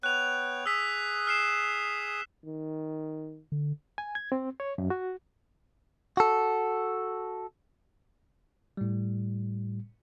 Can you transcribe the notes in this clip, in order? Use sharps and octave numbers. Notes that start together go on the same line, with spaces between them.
B3 C#5 G5 F#6 F7
G#4 D#6 E6 B6
F6 C7 E7
D#3
D3
G#5
G#6
C4
C#5
F#2
F#4
F#4 A4
A2 G3